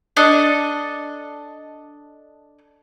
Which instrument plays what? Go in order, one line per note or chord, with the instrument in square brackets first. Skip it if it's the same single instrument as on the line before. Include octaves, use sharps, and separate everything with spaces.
[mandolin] D4 A4 D#5